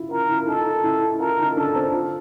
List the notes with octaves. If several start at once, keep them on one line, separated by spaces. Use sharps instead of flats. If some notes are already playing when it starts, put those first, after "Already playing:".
Already playing: E4 F4
F4 A#4
E4
D#4 A4
E4
F4 A#4
D#4
D4 A4
C4
F4